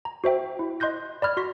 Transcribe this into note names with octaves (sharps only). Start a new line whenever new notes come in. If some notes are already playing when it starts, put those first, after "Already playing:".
A#5
F#4 C5 E5 G5
E4
D#5 C6 F#6 G6 A#6
D5 B5 F6 G#6
F#4 C6 A#6 B6